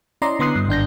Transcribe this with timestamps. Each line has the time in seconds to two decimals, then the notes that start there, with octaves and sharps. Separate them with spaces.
0.22 C#4 E4 D5 D#5 A#5 C6
0.39 D3 B3 C6 D#6 F#6 C7
0.55 G2
0.69 G#1 D4 G6 A#6